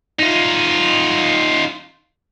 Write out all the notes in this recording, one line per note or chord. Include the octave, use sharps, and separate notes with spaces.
D#4 F4